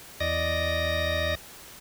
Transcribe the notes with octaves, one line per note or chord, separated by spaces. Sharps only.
E2 D5 D#5 A#6